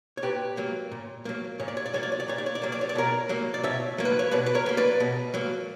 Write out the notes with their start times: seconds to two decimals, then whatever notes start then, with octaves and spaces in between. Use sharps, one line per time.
0.17 C#5
0.23 A#2 G4 B4
0.57 F#3 A#3
0.91 A#2
1.25 F#3 A#3
1.59 A#2 C#5
1.68 D5
1.77 C#5
1.86 D5
1.94 F#3 A#3 C#5
2.03 D5
2.12 C#5
2.20 D5
2.28 A#2 C#5
2.38 D5
2.46 C#5
2.55 D5
2.62 F#3 A#3 C#5
2.72 D5
2.81 C#5
2.89 D5
2.95 B2 A#4 C#5
3.29 F#3 A#3
3.54 D5
3.63 B2 C#5 E5
3.98 F#3 A#3
4.05 B4
4.19 C#5
4.31 B2 B4 D5
4.46 B4
4.55 A#4 C#5
4.66 F#3 A#3
4.77 B4 D5
5.00 B2
5.34 F#3 A#3